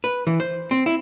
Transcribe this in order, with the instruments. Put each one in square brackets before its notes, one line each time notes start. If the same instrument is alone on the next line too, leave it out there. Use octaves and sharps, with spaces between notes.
[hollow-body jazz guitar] B4
E3
C5
C4
E4